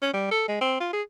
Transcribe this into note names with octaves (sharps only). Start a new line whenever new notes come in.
C#4
G3
A4
G#3
C4
F4
G#4